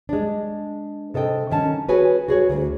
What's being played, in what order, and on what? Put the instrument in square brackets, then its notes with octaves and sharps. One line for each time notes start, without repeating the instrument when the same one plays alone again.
[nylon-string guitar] G#3 D4
C3 A4 D#5 G5
D#3 C#4 A5
F#4 G#4 B4 C#5 G#5
F#4 G#4 C#5
D2